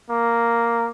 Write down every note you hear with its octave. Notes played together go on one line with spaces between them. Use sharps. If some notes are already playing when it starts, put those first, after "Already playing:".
A#3